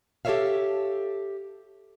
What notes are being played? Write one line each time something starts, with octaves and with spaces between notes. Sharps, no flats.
G4 A4 B4 C#5 E5 F5